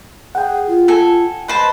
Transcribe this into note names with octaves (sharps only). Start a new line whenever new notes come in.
G#4 F#5 G5
F4
A4 G#5
B4 C5 D#5 A5